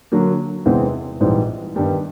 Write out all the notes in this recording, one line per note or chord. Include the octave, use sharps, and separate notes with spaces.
D3 F#3 A#3
E2 C3 E3 G#3 C4
A#1 G#2 E3 G3 C4
G2 D#3 G3 B3